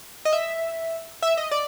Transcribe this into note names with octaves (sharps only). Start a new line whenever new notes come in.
D#5
E5
E5
D#5
D5